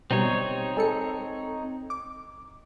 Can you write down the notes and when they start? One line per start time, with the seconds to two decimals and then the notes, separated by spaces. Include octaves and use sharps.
0.11 B2 G3 C4 D#4 C#5
0.77 G#3 A4 C#7
1.90 D6